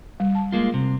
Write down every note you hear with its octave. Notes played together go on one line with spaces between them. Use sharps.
G3
A5
G#3 A#3 F4
C3